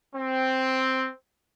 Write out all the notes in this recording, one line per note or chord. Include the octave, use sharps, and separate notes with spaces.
C4